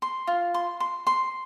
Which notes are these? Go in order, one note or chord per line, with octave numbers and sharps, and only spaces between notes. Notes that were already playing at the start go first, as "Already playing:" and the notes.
C6
F4
C6
C6
C6